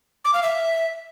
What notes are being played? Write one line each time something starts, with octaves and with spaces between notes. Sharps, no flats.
D6
F5
E5